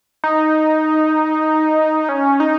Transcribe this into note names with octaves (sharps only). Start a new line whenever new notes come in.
D#4
C#4
D#4